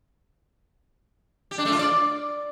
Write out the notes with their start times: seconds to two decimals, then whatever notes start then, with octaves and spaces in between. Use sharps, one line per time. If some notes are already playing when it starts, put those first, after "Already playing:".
1.51 G4
1.58 D4
1.65 A3
1.72 F4
1.79 D5